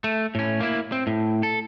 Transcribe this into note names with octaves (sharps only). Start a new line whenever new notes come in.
A3
A2 C#4
A#3 E4
C4
A2
A4